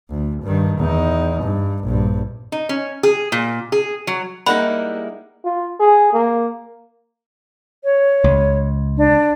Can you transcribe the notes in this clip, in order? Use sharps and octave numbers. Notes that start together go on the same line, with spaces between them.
D2
G2 D#3
E2 D#4
G2
A#1 G2
D#4
C#4
G#4
A#2
G#4
F#3
G3 G#3 A#3 D#4 E4 F#4 F#5 B5
F4
G#4
A#3
C#5
C#2
D4